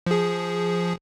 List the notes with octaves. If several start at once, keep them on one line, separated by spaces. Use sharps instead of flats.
F3 G#4